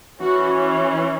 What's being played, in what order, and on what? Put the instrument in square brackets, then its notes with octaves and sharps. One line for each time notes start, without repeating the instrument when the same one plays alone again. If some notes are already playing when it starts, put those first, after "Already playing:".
[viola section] E3 C#4 F#4